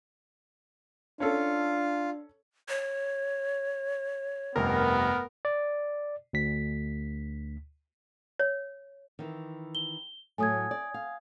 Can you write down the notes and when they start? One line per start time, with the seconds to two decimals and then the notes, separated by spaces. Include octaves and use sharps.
1.20 C#4 D4 F4 A4 F5
2.69 C#5
4.56 F1 G2 C3 B3 A#4
5.45 D5
6.33 D2 B6
8.39 C#5
9.19 D#3 E3
9.75 G7
10.38 A2 F#3 A3 G#5 D#6 G#6
10.71 D5
10.94 F5